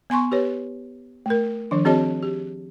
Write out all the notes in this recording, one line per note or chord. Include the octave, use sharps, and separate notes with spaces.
B3 G#5 C6 C#6
G4 B4 C#5
A3 A#4
D#3 F3 D4
C4 F#4 G#4 C#5 D#5 A5
G4